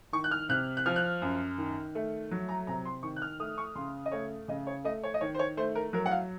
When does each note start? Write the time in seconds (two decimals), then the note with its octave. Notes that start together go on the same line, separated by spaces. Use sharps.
0.13 D#3 C#6
0.24 F#6
0.31 F6
0.49 C3 F#6
0.77 F#6
0.86 F3 F6
0.96 F#6
1.22 F#2
1.58 D#3
1.95 A3
2.31 F#3
2.49 A#5
2.67 C3 A#5
2.85 C6
3.03 D#3 C#6
3.16 F#6
3.22 F6
3.40 A3 D#6
3.58 C#6
3.75 C#3 C6
4.06 D#5
4.12 A3 C#5
4.48 C#3 D#5
4.67 C#5
4.84 A3 D#5
5.04 C#5
5.14 D#5
5.21 D#3 C#5
5.35 C5
5.39 C#5
5.57 A3 C5
5.75 A#4
5.93 F#3 A#4
6.06 F#5
6.11 F5